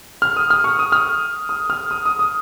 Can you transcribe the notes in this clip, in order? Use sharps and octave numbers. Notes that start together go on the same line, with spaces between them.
F6
D#6
F6
C#6
D#6
F6
D#6
F6
D#6
D#6
D#6